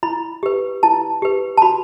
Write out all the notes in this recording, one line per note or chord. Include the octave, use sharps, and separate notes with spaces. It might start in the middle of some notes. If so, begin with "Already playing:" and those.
E4 B5
G4 B4
E4 A5
G4 B4
A5
F#4 B5